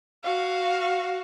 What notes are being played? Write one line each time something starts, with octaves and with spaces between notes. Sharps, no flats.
F#4 F5